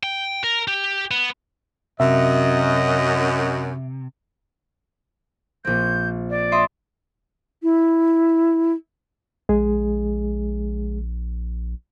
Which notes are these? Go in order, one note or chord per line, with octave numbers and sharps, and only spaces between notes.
G5
A#4
G4
B3
F#2 C3 D#5 E5
A#1 C4 G6
D5
D#5 E5 C6
E4
A#1 G#3 G#4